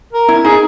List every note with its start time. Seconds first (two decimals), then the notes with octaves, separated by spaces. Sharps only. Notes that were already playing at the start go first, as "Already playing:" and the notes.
0.13 A#4
0.29 E4
0.45 D#4 G#4